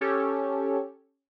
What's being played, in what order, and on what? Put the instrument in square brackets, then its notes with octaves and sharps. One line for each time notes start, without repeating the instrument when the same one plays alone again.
[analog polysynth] C#4 G4 A4 C#5